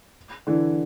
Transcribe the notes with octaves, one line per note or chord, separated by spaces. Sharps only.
D3 E3